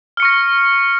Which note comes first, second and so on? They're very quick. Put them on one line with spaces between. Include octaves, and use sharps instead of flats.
F6 C#7 C#6 A#6